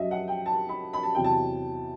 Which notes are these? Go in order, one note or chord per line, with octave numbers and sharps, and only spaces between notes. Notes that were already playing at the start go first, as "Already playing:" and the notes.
Already playing: F#2 F#3 D#5 E5
F#5
G5
A5
B5
B5
A5
E2 C3 F#3 G5
A5